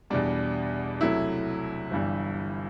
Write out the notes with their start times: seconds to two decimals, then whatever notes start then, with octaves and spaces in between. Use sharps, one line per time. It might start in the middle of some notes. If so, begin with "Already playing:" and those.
0.10 E2 B2 G3 D4
1.01 C2 C3 F#3 A3 E4
1.91 G1 G2 E3 G3